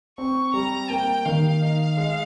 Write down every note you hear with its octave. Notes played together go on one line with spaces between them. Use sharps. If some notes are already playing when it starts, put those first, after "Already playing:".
C4 C#6
G3 A#5
A#3 G5
D#3 F5
D#4
G#3